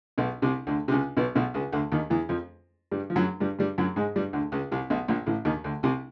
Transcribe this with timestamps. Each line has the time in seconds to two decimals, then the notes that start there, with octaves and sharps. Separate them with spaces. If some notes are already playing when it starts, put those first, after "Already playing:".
0.18 B1 B2
0.42 C2 C3
0.67 D2 D3
0.88 C3
0.92 C#2 C#3
1.17 B1 B2
1.35 B1 B2
1.54 C#2 C#3
1.73 D2 D3
1.92 D#2 D#3
2.10 E2 E3
2.29 F2 F3
2.91 G2 G3
3.10 F3
3.16 F#2 F#3
3.40 G2 G3
3.59 G2 G3
3.78 F#2 F#3
3.96 G#2 G#3
4.16 G2 G3
4.33 D2 D3
4.52 C#2 C#3
4.71 C2 C3
4.90 B1 B2
5.08 A#1 A#2
5.26 A1 A2
5.45 D#2 D#3
5.64 D2 D3
5.83 C2 C3